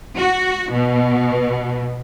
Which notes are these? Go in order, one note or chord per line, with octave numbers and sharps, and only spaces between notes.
F#4
B2